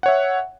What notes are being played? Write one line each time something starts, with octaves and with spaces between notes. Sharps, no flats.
C#5 E5 F#5